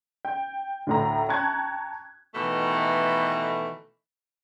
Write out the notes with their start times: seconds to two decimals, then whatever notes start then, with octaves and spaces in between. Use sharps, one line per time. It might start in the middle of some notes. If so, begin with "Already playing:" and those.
0.25 G5
0.87 D2 A2 A#5
1.29 G5 A5 A#5 C#6 F#6 G#6
2.35 B2 D#3 E3 A3